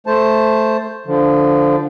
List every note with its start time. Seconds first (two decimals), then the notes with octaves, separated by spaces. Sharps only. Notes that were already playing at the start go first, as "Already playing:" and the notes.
0.07 A3 C5 A5
1.06 D3 F3